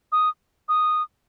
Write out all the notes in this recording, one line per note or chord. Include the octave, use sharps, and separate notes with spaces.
D#6
D#6